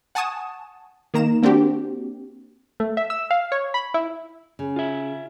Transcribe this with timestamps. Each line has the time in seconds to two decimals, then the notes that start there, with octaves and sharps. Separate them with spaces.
0.15 F#5 G#5 A5 C#6 D#6 E7
1.14 D#3 A#3 A#5 E7
1.43 A#3 C4 D4 F#4 G4
2.80 A3
2.97 E5
3.10 E6
3.31 F5
3.52 C#5
3.74 B5
3.94 E4
4.59 C#3
4.76 F4 E5